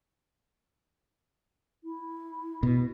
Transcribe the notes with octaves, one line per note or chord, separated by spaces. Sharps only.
E4
B2